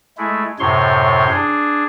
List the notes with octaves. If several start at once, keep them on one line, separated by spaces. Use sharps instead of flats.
G#3 A3 E4
F#2 A2 C3 C#5 C6
D4 G#4